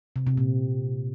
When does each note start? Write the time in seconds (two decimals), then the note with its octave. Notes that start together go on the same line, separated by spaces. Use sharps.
0.16 C3
0.27 C3
0.37 A#2